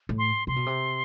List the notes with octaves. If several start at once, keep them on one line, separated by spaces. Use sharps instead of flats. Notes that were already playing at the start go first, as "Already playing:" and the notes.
A2
C6
C3 C6
B2
C3